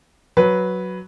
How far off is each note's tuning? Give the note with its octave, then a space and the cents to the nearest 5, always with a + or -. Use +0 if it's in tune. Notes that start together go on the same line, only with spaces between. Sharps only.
F#3 +0 B4 +0